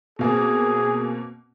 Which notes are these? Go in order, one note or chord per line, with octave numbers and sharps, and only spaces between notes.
B2 A#3 C4 G#4